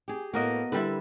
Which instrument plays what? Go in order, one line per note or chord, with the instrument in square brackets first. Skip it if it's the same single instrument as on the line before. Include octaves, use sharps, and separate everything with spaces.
[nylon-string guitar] G4 G#4
[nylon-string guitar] A2 A#3 [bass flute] B3 [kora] F#4 A#4 D#5
[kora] D3 G3 E4 [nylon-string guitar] B4